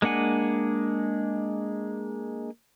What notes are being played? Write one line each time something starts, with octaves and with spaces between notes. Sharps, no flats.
G#3 A#3 D4 F#5 G#5